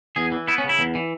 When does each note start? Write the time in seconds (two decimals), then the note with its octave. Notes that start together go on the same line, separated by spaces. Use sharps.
0.16 E2 G#4
0.32 E3
0.48 B3 E4
0.58 C#4
0.64 C#3 E4
0.79 E2
0.95 E3